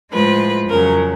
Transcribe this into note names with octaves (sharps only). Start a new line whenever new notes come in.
A2 F3 G#3 B4
F2 C#3 F#3 A#4